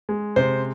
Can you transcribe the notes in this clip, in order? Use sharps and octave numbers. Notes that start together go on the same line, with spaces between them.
G#3
C3 C5